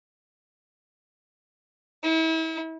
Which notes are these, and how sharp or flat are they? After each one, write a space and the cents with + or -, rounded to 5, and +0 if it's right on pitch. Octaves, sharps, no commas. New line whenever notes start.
E4 -35